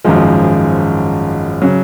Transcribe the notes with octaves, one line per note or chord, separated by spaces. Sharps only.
G#1 F#2 F3 G#3
C#3 F#3